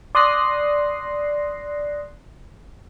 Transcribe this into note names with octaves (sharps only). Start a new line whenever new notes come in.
D5 C6 D#6 F#6 A#6 C7